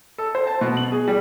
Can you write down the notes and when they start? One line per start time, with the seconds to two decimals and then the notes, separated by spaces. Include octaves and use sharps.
0.18 A4
0.35 C5
0.47 A5
0.61 B2
0.77 F#7
0.92 G#4
1.08 G3